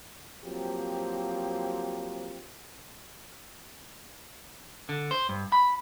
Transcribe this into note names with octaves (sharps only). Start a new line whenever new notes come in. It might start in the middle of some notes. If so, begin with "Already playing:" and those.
F3 F#3 A#3 C4 G4
D3
C5
G2
B5